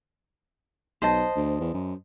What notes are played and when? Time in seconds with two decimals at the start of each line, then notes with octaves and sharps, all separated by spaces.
1.02 B1 C5 D#5 A5
1.36 D2
1.60 E2
1.74 F#2